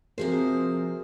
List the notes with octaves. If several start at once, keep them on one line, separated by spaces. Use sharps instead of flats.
C3 F3 F#4 G#4 A#4 C5